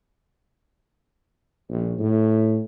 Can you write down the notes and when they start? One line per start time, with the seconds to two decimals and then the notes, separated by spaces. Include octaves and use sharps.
1.69 A#1
1.98 A2